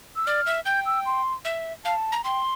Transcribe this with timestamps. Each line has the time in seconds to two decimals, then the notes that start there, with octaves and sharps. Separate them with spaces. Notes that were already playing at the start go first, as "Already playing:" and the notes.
0.16 E6
0.26 D5 F6
0.46 E5
0.66 G5 G6
0.86 E6
1.06 C6
1.45 E5
1.85 F5 A5
2.12 A#5
2.24 G5 C6